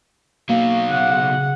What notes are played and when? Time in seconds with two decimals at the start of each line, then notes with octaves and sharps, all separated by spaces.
0.49 B2 F#3 A#3 F5
0.90 C#3 F#5